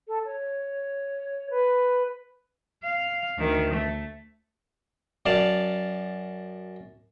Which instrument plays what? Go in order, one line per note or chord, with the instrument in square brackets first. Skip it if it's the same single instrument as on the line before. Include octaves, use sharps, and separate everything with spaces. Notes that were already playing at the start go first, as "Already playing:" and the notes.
[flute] A4
C#5
B4
[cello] F5
D2 D#3
A3
[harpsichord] F#2 D5 F5 A5